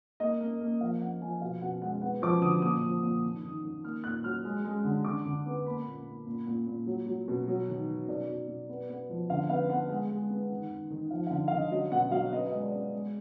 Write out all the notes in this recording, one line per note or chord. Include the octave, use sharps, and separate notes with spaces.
A#3 D#5
A#3
A#3
F3 F5
A#3 F#5
F3 G#5
B2 F5
B2 F#5
G#3 F#5
B3 F#5
F3 D6
D3 D#6
A#2 D#6
F3
A#2
D#3
D#3
D#3
A#3 F6
A#2 F#6
F#3 F6
G#3
G#3
D3
D3 D6
D3
B3
A#3 B5
A#2
A#3
A#2
A#2
A#2
F#3
F#3
B2
F#3
D#3
D#3
B2 D5
B2
B2
B3
B3
F3
D3 F5
B3 F5
B3 F#5
G#3 F#5
G#3
B3
D#3
D#3
D#3
F3 F5
D3 F5
F5
D3 D#5
F#3 D#5
B2 F#5
F#3 F5
B3 D#5
D#5
G#3
D5
G#3
G#3